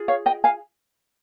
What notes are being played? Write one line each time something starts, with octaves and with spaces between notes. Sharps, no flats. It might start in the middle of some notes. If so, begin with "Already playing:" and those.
Already playing: F4 G#4
C#5 F5
D#5 G5
F5 G#5